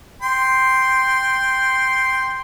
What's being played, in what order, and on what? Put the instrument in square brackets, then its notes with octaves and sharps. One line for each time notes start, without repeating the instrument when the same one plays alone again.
[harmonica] G5 C6